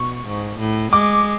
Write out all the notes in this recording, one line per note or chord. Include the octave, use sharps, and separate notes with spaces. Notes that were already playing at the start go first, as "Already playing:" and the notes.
Already playing: B2 C#6
G#2
A2
G#3 D6